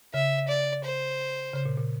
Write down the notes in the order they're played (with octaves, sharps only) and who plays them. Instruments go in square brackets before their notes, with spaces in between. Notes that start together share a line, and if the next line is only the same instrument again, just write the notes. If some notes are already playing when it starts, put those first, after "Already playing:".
[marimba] C#3 [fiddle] E5
[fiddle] D5
C5
[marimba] C#3
A#2
A#2